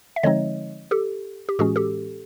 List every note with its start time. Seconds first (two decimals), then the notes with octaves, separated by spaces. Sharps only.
0.16 E5
0.23 D3 F3 G#3 C4 D#4 C#5 D#5
0.91 G4 A4
1.49 G4
1.59 A2 E3 G#3 C#4 F#4 G#4
1.76 G4 A4